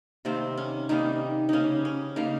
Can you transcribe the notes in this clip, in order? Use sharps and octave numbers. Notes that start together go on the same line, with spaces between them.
C3 D#3 G3 A#3 C4
C#4
C3 D#3 G3 A#3 D#4
C#3 G3 A#3 C#4 D#4
C#4
C#3 G3 A#3 D#4